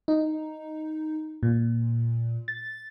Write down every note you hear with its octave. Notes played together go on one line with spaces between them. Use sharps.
D#4
A#2
A6